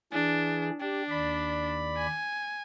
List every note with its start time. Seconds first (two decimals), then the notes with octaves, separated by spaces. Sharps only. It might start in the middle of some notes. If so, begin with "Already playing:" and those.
0.13 E3 D4 G#4
0.81 D4 G4
1.10 D#2 D5 B5
1.97 G#5